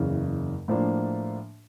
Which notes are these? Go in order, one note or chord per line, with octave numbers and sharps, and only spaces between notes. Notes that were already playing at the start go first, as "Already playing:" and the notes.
Already playing: F#1 E2 C#3
A2 F3 A#3 D4